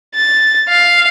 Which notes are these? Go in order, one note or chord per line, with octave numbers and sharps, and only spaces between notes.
A6
F5